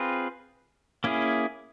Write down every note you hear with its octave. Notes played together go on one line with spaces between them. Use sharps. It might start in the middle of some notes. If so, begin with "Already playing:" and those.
Already playing: C4 F4 G#4 B4
A#3 C#4 E4 G#4